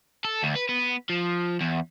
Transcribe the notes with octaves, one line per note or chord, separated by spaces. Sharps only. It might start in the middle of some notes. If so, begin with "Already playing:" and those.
A4
D2
B4
B3
F3
E2